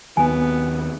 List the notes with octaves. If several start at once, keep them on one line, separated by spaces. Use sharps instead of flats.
D#2 D#3 F#3 B3 G#5